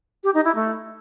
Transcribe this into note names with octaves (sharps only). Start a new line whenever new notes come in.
G4
D#4
E4
A3